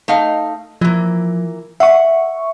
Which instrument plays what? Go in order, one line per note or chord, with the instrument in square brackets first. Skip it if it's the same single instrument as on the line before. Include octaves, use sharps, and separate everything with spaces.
[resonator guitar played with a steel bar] A3 D#4 F5
[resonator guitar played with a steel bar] E3 A#3 [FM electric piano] F3
[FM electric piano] E5 C#6 [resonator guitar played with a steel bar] F#5